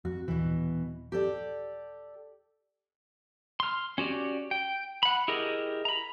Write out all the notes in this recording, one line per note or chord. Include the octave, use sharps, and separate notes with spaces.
F2 F#4
D#1 B2 E3
G4 A4 D5
C6 F6
C#4 F#4 G4 D5
G5
F#5 B5
E4 G4 G#4 A#4 D#5
A#5 B5